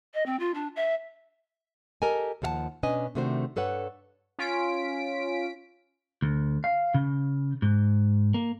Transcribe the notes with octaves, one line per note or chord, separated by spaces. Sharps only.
D#5
C4
F4
D4
E5
G4 A4 A#4 D#5 G#5
D#2 F3 A4 F5 F#5 A5
B2 C#4 D4 B4 D#5 G#5
C3 D#3 A3 D4 F#4 C5
G2 A4 B4 C#5 F#5
C#4 F4 B6 D7
D2
F5
C#3
G#2
A#3